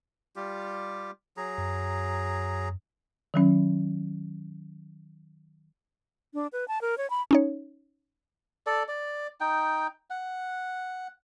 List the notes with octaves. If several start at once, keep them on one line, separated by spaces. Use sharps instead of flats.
G3 F4 G4
F#3 G#4 A#5
F#2
D#3 F#3 C#4
D4
B4
A5
A#4
C#5
B5
C#4 D#4 C#5
A4 D5
D5
D#4 G5
F#5